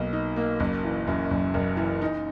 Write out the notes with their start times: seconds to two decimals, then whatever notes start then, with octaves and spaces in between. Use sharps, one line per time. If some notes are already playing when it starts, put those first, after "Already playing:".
Already playing: B1 B2 A#3
0.13 D#4
0.36 A#3
0.60 F#1
0.84 E3
1.07 F#2
1.30 F#1
1.54 F#1
1.77 E3
2.02 D#4